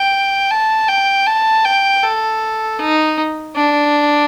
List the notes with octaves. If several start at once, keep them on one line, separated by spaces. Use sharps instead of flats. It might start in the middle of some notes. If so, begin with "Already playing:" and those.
Already playing: G5
A5
G5
A5
G5
A4
D#4
D4